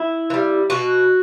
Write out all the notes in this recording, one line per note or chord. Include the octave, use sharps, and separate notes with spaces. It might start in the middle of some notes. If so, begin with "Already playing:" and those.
Already playing: E4
E3
G3
B2 F#4